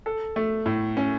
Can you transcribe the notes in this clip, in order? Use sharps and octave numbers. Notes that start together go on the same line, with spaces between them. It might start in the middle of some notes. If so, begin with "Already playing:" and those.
A4
A3
A2
C#4